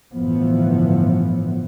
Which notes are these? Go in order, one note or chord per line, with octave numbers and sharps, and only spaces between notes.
G1 A2 E3 F3 B3